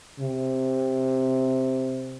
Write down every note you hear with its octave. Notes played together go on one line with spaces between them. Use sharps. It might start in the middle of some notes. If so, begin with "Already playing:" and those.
C3